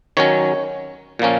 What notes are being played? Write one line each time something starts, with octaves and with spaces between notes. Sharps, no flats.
D#3 F#3 C#4 C#5
A#2 F3 A#3 C#4